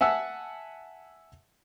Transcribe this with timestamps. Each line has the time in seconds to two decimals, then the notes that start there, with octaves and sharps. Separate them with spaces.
0.01 E5 F#5 G#5 A5 E6